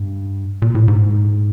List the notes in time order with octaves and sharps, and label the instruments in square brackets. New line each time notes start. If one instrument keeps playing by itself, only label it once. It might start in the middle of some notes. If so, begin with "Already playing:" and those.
Already playing: [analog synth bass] G2
A#2
A2
G#2